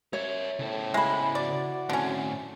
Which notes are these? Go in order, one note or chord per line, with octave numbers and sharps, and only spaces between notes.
A#4 C#5 E5
A2 C#3 C5
G#3 E4 B5
F#4 D5
A2 D3 C4 C#4